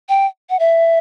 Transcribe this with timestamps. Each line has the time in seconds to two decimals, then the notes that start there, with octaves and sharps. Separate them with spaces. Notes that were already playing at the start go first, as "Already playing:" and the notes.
0.09 G5
0.50 F#5
0.59 E5